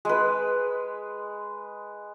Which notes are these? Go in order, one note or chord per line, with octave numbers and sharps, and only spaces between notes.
G#3 B4